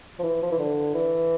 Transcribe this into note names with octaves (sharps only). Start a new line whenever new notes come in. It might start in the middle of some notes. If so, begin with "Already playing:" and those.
F3
E3
F3
E3
D3
E3